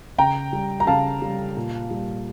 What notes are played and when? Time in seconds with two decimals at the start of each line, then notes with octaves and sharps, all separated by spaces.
0.18 C#3 G5 A#5
0.53 G3
0.80 A#5
0.87 C#3 F5 A5
1.22 G3
1.57 A#2
1.91 G3